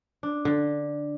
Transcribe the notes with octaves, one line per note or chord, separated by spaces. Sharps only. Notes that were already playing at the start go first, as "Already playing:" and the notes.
D4
D3